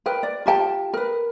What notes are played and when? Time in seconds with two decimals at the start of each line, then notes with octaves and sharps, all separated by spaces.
0.06 A#4 B4 G5
0.23 D5
0.46 F4 G4 G5 A5
0.94 A#4 B4